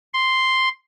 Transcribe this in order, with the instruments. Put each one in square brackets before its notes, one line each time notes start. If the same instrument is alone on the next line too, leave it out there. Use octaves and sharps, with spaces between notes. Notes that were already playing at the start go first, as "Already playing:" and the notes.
[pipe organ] C6